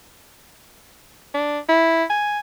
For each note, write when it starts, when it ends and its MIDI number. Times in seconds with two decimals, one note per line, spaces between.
1.34 1.59 62
1.69 2.04 64
2.10 2.39 80